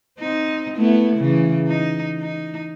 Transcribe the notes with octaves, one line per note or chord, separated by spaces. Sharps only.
C4 D#4
A3 B3 E4
C#3 E3
D#4
D#4